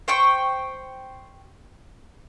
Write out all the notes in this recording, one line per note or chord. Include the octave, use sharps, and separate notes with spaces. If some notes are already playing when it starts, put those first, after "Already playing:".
C5 G5 C#6